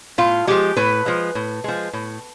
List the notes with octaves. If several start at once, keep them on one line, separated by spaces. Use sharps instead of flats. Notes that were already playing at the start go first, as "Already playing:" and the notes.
A2 F4
F3 G#3 G4
A2 B4
F3 G#3
A2
F3 G#3
A2